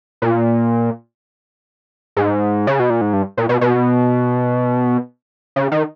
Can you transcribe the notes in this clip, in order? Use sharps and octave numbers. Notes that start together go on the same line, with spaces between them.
A#2
G#2
C#3
B2
A#2
G#2
G2
A#2
B2
B2
C#3
D#3